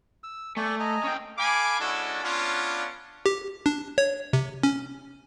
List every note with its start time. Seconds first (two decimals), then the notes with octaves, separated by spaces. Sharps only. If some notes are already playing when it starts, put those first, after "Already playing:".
0.24 E6
0.57 A3 D5 G#5 C#6
0.79 D#5 G#5 A#5
1.04 C#4 G5
1.37 A4 F5 G#5 B5 D6
1.79 G#3 C#4 D4 E4 F#4 A4
2.24 B3 C#4 D4 F4
3.26 G4
3.66 D4
3.98 C#5
4.33 C3
4.63 C#4